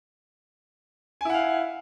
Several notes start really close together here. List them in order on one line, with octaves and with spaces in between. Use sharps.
G#5 E4 F#5 F5